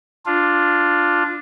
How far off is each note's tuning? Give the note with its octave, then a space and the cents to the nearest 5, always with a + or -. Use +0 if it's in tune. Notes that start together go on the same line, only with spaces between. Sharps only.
D4 +0 F4 +0